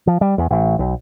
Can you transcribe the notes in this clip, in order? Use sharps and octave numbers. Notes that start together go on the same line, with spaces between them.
F3
G3
E2
A1
B1